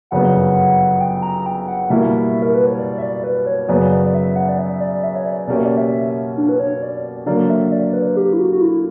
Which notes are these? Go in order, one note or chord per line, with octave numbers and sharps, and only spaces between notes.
G1 F#2 C#3 F#3 B3 F#5
G5
A#5
G5
F#5
B2 G3 A#3 E4 E5
A#4
B4
C#5
D5
E5
D5
B4
C#5
F#2 C#3 F#3 B3 D5
D5
D5
E5
F#5
D5
E5
D5
E5
C#5
D5
B2 A#3 C#4 G4 D5
E5
D5
E5
D4
B4
C#5
D5
D3 F#3 A#3 D5
E5
D5
B4
G4
E4
F#4
F#4
E4